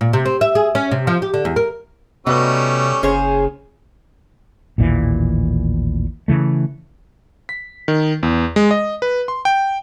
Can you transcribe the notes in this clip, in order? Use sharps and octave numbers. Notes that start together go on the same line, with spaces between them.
A#2
C3
C4
E5
G#4
C#4
C3
F3
G4
D3
E2
A#4
C3 G3 A3 B3 C#4 D#4 F#4 B4
F#1 C#3 G#4 C5 C#5
A1 D#2 A#2 E3
C#3 E3 A3
B6
D#3
E2
G#3
D#5
B4
C6
G5